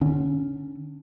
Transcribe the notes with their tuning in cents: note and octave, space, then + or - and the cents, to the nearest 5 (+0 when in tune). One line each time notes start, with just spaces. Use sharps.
D3 +35 C#4 +5